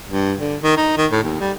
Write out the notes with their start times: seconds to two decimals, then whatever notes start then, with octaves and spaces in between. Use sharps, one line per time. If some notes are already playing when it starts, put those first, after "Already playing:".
0.08 G2
0.38 D3
0.63 D#3
0.77 D#4
0.97 D#3
1.11 A2
1.23 D#2
1.41 G3